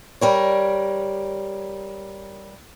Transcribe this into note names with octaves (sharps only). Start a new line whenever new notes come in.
G3 A#4 C#5